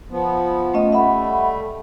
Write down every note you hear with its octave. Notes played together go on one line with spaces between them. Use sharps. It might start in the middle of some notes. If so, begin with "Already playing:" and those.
F3 B3
A3 C#4 D#5
G3 A3 E5 F#5 B5